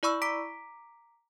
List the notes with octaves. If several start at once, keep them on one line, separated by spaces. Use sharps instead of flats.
E4 D5 B5 C#6 E6
A#5 D6 B6 D7